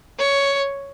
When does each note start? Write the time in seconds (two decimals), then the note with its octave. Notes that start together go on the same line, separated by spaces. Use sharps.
0.19 C#5